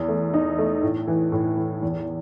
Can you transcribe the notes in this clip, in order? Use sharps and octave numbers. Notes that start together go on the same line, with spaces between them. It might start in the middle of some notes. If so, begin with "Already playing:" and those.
Already playing: E2
A3
D#4
A3
A2
E3
A2
E3
E2